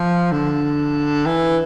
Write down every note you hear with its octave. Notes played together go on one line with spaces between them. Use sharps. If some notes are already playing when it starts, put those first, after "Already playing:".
Already playing: F3
D3
E3